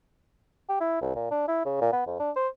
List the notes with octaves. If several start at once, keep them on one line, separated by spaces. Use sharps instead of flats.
G4
E4
C2
A#2
D4
E4
C#3
A#2
B3
F2
D4
C5